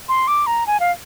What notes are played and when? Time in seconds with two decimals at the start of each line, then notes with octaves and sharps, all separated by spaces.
0.09 C6
0.27 D6
0.46 A#5
0.67 G#5
0.80 F5